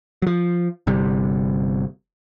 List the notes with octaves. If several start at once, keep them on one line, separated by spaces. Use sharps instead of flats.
F3 F#3
G1 C3 G3